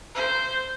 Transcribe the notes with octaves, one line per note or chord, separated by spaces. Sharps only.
C5